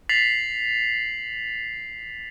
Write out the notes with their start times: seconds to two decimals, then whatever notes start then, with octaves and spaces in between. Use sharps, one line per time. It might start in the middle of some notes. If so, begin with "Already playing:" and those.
0.09 A6 B6 C7 F7 F#7